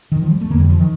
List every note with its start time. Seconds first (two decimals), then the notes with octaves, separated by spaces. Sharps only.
0.12 D#3
0.22 F3
0.31 G3
0.41 A3
0.50 F2 D3 A#3
0.59 G3
0.69 F3
0.79 D#3